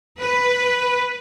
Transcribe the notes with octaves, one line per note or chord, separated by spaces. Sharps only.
B4